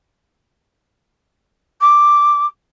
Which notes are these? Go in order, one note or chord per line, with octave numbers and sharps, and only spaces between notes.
D6